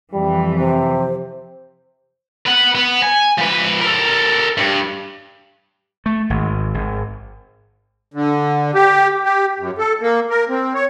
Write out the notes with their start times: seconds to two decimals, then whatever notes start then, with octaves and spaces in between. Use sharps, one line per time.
0.14 F2 E3 G3
0.58 C3 C5
2.46 B4 F#5
2.75 B3
3.02 G#5
3.38 F3 B4
3.81 A4 A#4
4.58 G2
6.06 A3
6.30 G#1
6.74 G#1
8.14 D3
8.74 G4
9.25 G4
9.60 F#2
9.78 A4
10.01 A#3
10.30 A#4
10.49 C4
10.75 C#5